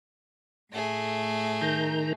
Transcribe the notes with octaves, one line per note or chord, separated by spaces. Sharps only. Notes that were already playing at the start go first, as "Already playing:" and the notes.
A2 A3 G#4
D#3 A#5 G6